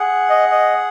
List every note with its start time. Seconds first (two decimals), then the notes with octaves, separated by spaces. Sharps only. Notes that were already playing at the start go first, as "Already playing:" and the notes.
Already playing: G#4 F#5
0.29 D#5
0.51 D#5